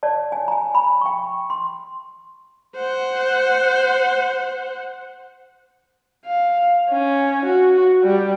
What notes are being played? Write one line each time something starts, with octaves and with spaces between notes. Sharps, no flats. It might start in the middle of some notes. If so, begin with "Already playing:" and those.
C#5 D5 A5
G#5
G#5 A#5
B5
G5 C#6
C6
C5 F#5
F5
C#4
F#4
G3